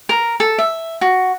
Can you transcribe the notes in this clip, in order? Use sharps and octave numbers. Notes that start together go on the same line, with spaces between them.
A#4
A4
E5
F#4